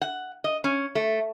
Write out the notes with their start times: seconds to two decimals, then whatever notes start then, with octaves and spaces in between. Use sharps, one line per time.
0.01 F#5
0.44 D#5
0.64 C#4
0.95 A3